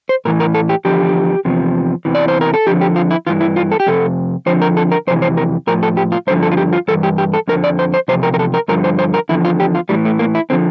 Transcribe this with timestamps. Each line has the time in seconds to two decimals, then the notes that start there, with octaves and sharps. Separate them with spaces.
0.09 C5
0.25 A2 E3 A#4
0.40 A#4
0.54 A4
0.69 G4
0.85 E2 D3 F3 G4
1.45 E2 C3 F3
2.05 E2 C3 E3
2.15 D5
2.28 C5
2.41 A#4
2.54 A4
2.66 F2 D3 F3 G4
2.81 G4
2.96 F4
3.11 E4
3.27 G2 E3 F4
3.41 E4
3.56 F4
3.71 A4
3.80 G4
3.87 F2 C3 A4
4.46 F2 D3 F3 C5
4.62 A#4
4.77 A4
4.92 A#4
5.07 F2 C3 E3 C5
5.22 C5
5.37 A#4
5.67 A2 F3 A#4
5.83 A4
5.97 G4
6.12 F4
6.27 G2 D3 F3 C5
6.43 A4
6.51 F4
6.57 G4
6.73 F4
6.88 G2 E3 A4
7.03 G4
7.18 G4
7.34 A4
7.48 F2 D3 F3 A#4
7.64 D5
7.79 C5
7.94 C5
8.08 E2 C3 F3 C5
8.23 A#4
8.34 A#4
8.39 A4
8.54 A#4
8.68 G2 D3 F3 A#4
8.84 C5
8.99 C5
9.14 A#4
9.29 E2 D3 F3 E4
9.45 F4
9.60 G4
9.75 F4
9.89 A2 E3 G3
10.05 A3
10.19 A#3
10.35 E4
10.50 D3 F3 C4